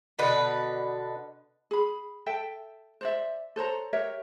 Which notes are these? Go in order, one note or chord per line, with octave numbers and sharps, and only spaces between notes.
B2 D3 B4
G#4 B5
A4 E5 G5
C5 D5 E5
A4 C5 C#5 A#5
G4 A#4 C#5 E5